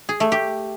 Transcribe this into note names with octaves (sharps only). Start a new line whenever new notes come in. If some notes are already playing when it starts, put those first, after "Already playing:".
G#4
A3
G4